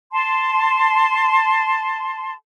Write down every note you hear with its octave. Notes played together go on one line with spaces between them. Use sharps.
A5 C6